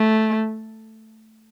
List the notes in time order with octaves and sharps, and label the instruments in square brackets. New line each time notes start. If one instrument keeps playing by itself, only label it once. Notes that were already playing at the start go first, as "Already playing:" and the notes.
Already playing: [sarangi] A3